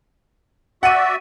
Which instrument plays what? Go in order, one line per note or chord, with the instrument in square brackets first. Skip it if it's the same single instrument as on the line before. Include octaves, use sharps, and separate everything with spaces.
[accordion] F#4 D5 E5 [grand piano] F#5 D#7